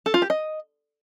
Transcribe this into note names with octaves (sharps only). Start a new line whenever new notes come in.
A4
F4
G4
D#5